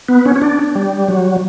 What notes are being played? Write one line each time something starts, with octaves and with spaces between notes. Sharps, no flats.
B3
C#4
C#4
D4
G3
F#3